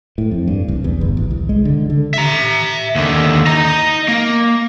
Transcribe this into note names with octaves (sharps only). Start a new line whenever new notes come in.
A2
F2
G2
C2
E2
G1
A1
C2
G#3
D3
D3
E5 A#5
D#2 D3
D#5 A#5
A#3